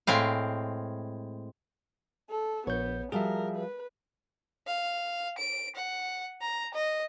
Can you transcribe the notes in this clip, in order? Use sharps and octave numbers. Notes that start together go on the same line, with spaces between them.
A2 G#3 C4 F5
A4
A#1 B3 C#5 G6
F3 G3 F#4 G#4 A#4 E5
B4
F5
D7
F#5
A#5
D#5